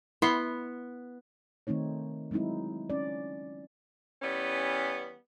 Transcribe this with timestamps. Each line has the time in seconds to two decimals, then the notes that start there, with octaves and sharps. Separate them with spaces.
0.22 B3 E4 C6
1.67 D#3 A3 C4 D#4 C#5
2.31 F#3 G#3 C4 D#4 E4
2.90 C#4 D5
4.22 E3 G3 B3 C#4